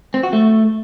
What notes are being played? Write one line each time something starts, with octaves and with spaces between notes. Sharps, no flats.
C4
F#4
A3